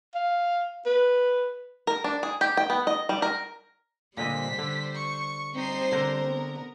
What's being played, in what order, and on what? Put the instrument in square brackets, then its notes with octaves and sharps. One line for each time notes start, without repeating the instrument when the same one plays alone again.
[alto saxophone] F5
B4
[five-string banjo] A#4
D4
G#4
G4
G5
B3
D#5
G3
A#4
[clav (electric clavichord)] A#2 D3 D#5 [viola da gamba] G3 C5 [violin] B6
[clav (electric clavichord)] D3
[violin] C#6
[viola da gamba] G3 C5 [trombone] C4 [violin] D#4 C7
[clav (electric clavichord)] D3 A#5 [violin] A#4
[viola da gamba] B3